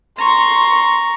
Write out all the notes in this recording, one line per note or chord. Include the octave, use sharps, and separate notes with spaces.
A#5 C6 C#6